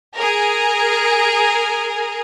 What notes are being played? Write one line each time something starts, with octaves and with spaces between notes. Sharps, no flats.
G#4 A#4